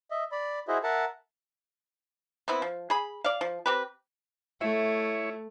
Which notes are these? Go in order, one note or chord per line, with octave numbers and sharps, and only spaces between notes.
D#5 E5
D5 B5
E4 F#4 G#4 C5 D#5 E5
A#4 E5 F#5 A5
B3 C4 E4
F3
G#4 B5
D5 F5
F3
C4 G4 B4
A3 E4 C#5 E5